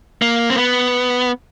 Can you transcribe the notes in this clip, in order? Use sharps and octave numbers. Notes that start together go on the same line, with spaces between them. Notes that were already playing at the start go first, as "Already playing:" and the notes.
A#3
C4
B3